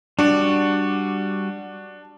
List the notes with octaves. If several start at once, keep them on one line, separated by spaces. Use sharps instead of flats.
G3 D4 F#4 D5